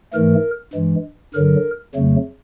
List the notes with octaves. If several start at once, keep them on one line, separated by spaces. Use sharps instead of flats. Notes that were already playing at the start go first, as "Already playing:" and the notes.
G#2 E3 A3 A#4
G2 E3 G#3
G2 D3 F#3 A#4
F2 C#3 F#3 A3